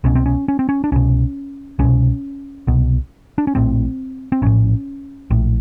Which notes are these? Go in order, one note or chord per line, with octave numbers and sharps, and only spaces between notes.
C2 B2 C#4
C4
C#4
C#4
C4
C#4
D4
C2 B2 C#4
C2 B2 C#4
C2 B2
D4
C#4
A#1 A2 C4
C4
A#1 A2 C#4
A#1 A2